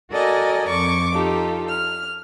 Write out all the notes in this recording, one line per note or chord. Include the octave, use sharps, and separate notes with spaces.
F#4 A4 A#4 D5 D#5 G#5
F2 C#6 D6
D#4 F4 G4 A4
F6